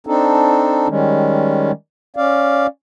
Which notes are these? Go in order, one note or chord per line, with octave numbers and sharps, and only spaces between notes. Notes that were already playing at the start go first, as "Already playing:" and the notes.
C4 D4 D#4 A4
D#3 G3 G#3 C#4
C#4 D5 F5